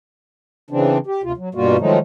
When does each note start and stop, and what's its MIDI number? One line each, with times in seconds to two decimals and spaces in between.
0.70 0.98 49
0.70 0.98 52
0.70 0.98 60
0.70 0.98 62
1.07 1.22 67
1.24 1.32 38
1.24 1.32 48
1.24 1.32 65
1.37 1.49 54
1.55 1.77 43
1.55 1.77 47
1.55 1.77 55
1.55 1.77 58
1.55 1.77 65
1.55 1.77 66
1.79 1.99 51
1.79 1.99 53
1.79 1.99 54
1.79 1.99 56
1.79 1.99 57
1.79 1.99 63